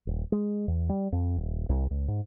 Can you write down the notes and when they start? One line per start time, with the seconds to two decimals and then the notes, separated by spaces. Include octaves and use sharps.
0.07 D#1
0.32 G#3
0.68 E2
0.89 G3
1.12 F2
1.36 D#1
1.69 C2
1.91 C#2
2.08 G#2